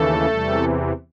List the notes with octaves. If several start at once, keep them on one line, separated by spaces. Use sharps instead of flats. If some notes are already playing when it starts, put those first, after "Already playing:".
Already playing: D#2 C#3 E3 A3 A4
E2 C3 E3 G3